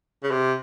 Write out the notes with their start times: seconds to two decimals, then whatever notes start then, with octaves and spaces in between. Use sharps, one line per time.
0.23 C#3
0.31 C3